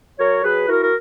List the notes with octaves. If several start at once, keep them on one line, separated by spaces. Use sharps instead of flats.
F#3 A#4 C#5
F#3 G#4 B4
E4 F#4 A#4
A#4